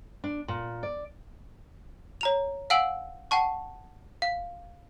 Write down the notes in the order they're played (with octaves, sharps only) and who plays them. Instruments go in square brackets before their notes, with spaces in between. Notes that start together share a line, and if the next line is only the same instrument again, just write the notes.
[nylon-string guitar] D4
A#2
D5
[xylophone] C#5 A#5 F7
F5 F#5 G#5 E6 D7 F#7
F#5 G5 A5 C#6
F5